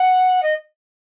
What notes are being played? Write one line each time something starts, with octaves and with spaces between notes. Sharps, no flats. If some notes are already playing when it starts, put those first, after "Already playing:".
Already playing: F#5
D#5